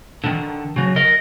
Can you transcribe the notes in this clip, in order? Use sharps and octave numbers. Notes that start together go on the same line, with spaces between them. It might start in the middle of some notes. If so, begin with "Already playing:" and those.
D3 D#3
C#3 F#3
A#4 D#5